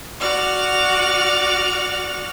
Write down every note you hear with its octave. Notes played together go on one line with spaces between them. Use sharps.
F#4 D5 F6